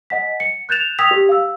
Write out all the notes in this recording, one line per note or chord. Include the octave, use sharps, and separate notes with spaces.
D#5 F#5 G#5 B6
C#7
F#6 G6 A6 E7 F7
G5 D#6 E6 G#6 B6 F7
G4
F5 E6